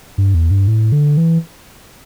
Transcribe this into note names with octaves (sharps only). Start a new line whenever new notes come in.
G2
E2
G2
A2
D3
E3